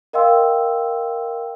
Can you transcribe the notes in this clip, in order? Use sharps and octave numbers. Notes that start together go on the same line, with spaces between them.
A#4 D#5 F5 G5 C6 E6